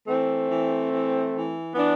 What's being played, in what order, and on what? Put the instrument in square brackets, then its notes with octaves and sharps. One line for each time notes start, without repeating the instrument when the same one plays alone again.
[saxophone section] E3 A3 C4
E3
E3
E3
E3 B3 D4